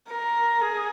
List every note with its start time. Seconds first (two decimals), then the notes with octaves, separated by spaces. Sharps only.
0.09 A#4
0.61 G#4